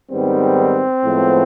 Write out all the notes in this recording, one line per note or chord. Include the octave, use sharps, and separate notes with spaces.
G#2 D#3 G3 B3 C4
A2 F3 G#3 B3